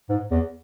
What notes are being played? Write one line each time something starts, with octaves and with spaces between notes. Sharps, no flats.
G#2
E2